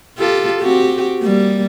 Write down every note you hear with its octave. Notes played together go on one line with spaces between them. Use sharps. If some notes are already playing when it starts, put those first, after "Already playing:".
F4 G4 A4
C4 F#4 G4
G3 A#3